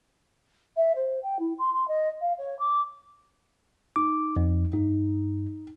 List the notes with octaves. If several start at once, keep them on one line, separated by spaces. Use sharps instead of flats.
E5
C5
G5
E4
C6
C6
D#5
F5
C#5
D6
D#4 D6
F2
G2 D#4